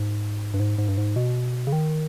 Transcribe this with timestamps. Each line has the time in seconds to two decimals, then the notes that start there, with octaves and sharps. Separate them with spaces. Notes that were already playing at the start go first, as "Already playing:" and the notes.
Already playing: G#2
0.54 G2
0.60 G#2
0.78 G#2
0.88 G2
0.97 G#2
1.16 B2
1.67 C#3
1.72 D#3